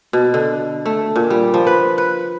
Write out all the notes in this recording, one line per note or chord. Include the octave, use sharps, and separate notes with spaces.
B2
D3
A3
A#2
G3
F3
B4
B4